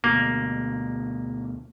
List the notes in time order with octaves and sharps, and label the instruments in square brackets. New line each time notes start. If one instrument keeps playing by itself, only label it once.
[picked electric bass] D2 B2 [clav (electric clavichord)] A#3